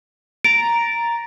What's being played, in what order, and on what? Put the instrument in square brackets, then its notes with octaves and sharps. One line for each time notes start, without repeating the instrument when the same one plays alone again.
[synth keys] A#5 A6 [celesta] D7